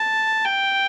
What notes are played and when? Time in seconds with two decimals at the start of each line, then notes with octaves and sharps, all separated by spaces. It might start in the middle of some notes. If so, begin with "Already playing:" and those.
Already playing: A5
0.45 G5